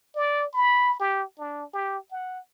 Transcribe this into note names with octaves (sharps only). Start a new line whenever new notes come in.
D5
B5
G4
D4
G4
F#5